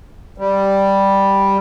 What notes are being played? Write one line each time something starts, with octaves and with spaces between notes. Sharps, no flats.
G3